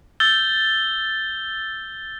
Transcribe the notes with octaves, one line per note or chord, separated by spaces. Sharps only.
E6 G6 A6 G7